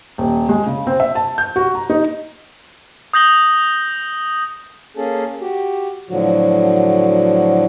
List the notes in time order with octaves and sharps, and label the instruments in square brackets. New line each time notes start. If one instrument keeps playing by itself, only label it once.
[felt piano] D#1
G#3
C#3
C4
E5
A5
G6
F#4
A#5
D#4
[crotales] D#6 G6 A#6 F#7 G7
[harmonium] A#3 C#4 G#4 A4
F#4 G4
A2 D3 F3 F#3 F#4